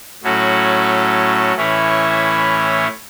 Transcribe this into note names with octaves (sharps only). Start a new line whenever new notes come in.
A2 F#3 C#4 F#4 A4
A2 E3 C#4 E4 C#5